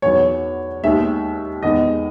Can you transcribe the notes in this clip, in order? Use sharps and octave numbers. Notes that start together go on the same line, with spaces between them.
E2 D#3 F#3 C#5
D#2 D#3 G#3 E5
E2 D#3 G#3 D#5